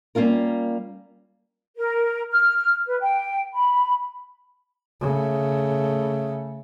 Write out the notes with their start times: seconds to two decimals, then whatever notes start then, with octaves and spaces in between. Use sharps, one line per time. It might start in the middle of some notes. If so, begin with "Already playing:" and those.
0.15 G3 A#3 C#4 F4 A#4
1.77 A#4
2.31 F6
2.87 B4
3.00 G5
3.53 B5
5.01 C#3 A3